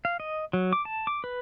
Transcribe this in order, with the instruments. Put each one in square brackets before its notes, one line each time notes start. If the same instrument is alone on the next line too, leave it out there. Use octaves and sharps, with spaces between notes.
[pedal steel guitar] F5
D#5
F#3
D6
A5
D6
B4